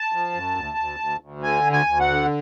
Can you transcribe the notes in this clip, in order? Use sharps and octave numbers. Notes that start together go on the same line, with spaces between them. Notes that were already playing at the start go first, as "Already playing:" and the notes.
Already playing: A5
F3
F#2
D2
D2
D2
D2
D3 G#5
D2
G#5
D2
F#5
D3